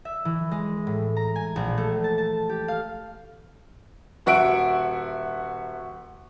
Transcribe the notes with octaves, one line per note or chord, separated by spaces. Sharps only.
E5
E3
G#3
A2
A#5
G#5
A#1
A3
A5
A5
G4
F5
D#1 F#4 E5 F#5 D7